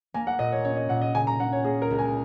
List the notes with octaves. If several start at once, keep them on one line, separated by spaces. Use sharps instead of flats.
A#3 G#5
F#5
A#2 D#5
C#5
C#4 C#5
D#5
A#2 F#5
D#5
C#3 G#5
A#5
C#4 F#5
C#5
A#3 G#4
A#4
C#2
G#5